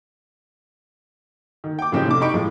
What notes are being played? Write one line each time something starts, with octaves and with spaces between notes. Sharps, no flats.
D#3
G5 D6
A2 C#3 F3 C4 D#4 G4
F1 D6
D#4 G4 B5 C#6 D7
A2 F3 G#3